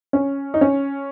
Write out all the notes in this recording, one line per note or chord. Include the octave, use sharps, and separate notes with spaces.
C#4
D#4
C#4